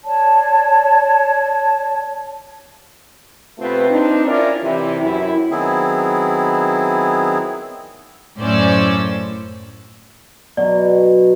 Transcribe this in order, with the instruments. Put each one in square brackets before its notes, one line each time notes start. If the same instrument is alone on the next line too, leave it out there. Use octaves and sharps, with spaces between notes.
[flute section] C#5 D5 A5
[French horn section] C3 A3 B3 C4 F4 B4
C4 D4 D#4
C#4 E4 F4 A#4 C#5 D5
C3 E3
F#2 E4
[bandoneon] D#3 F#3 B3 C4 E4 G#4
[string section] F#2 A2 C#4 C5 D5 E6
[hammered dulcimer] B2 F#3 [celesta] D5